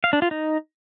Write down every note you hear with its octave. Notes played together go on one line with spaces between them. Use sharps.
F5
D4
F4
D#4